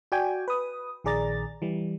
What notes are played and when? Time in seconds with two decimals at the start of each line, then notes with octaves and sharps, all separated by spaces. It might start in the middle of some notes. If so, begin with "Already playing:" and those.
0.12 F#4 D5 G5 G#5
0.48 B4 D#6
1.04 A#1 D#3 G#4 D5 A#5 A6
1.62 E3 G3